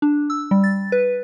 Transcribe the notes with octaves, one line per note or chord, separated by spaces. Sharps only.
D4
E6
G3
A6
B4